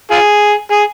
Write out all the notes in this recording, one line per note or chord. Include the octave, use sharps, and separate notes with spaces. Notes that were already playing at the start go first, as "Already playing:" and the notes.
F4 G#4
G#4